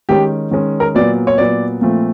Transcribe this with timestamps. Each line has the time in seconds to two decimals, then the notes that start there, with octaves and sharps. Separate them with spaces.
0.09 D#3 G#3 C#4 G4
0.51 D#3 G#3 C#4
0.80 A#4
0.95 A#2 F#3 B3 D5
1.27 C#5
1.38 A#2 F#3 B3 D5
1.81 A#2 F3 A3 C4